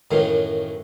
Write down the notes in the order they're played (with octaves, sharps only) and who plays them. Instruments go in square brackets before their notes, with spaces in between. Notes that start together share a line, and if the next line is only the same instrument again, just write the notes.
[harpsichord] F#2 A2 D#3 E3 F5